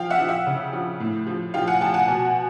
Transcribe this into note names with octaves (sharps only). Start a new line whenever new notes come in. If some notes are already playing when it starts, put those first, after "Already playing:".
Already playing: F3 F5 G5
E5 F#5
F3
E5
C#3
F3
A2
F3
F3 F5 G5
F#5 G#5
F3 G5 A5
F#5 G#5
B2